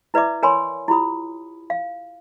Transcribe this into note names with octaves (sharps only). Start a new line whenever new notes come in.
E4 B4 D5 E5 D6
A#4 C#5 G#5 B5 C6
E4 F4 G4 B5 D#6
F5